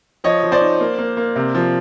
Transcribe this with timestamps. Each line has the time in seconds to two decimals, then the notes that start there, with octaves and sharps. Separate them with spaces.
0.24 F3 C#5 D#5
0.43 F3
0.52 C5 D5
0.61 D#4
0.80 A#3
0.98 A#3
1.17 A#3
1.36 C3
1.55 F3